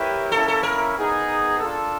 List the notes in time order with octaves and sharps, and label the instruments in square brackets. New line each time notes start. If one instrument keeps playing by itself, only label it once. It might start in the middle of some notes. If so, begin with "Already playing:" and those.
Already playing: [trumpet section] E4 G4 A#4 C#5 E5 [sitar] B4
[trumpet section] A#3 C#4 E4 [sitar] A4
[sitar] A4
A#4
[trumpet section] B3 D#4 G#4
D4 F4 A4